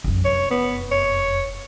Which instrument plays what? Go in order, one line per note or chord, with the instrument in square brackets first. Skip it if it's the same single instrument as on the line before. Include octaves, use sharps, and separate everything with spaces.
[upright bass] F1 F#2
[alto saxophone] C#5
B3
C#5